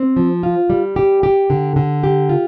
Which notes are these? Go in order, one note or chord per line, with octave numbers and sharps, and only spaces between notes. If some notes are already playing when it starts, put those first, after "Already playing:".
Already playing: C4
F3
F4
G3
G4
G4
D3
D3
G4
F4